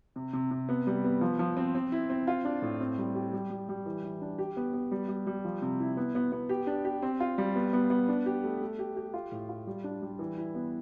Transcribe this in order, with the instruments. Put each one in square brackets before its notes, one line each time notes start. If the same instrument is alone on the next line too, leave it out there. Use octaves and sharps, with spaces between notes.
[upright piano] C3
C3
C3
B3
G3
B3
F3
F3
C4
C4
E4
C4
F4
D4
A2
C4
G3
G4
G3
G3
G3
E3
E3
D4
G4
B3
B3
G3
G3
G3
F3
C3
E4
B3
B3
B3
G4
D4
G4
C4
F4
G3
B3
B3
B3
D4
G4
A3
A3
G4
G4
F4
A2
F4
G3
D4
G3
E3
E4
B3